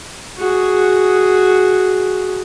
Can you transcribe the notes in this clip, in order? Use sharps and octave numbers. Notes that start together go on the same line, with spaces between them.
F#4 G#4